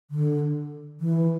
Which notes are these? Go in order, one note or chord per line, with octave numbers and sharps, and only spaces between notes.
D3
E3